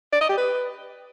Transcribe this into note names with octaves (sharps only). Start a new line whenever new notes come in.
D5
D#5
G4
B4